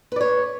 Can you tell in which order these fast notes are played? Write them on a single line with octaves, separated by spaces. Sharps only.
B4 D5 C#5